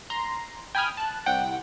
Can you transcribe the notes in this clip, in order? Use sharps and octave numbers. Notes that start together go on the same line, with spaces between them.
A#5 C6
G5 G#5 B5 D#6 F6 G#6
A5 F#6
C2 F#5 G5